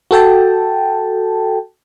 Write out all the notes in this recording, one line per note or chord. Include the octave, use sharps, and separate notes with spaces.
F#4 A4 G5 A5